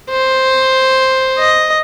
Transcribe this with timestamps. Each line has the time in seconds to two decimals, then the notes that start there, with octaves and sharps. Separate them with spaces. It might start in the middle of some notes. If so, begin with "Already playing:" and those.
0.10 C5
1.39 D#5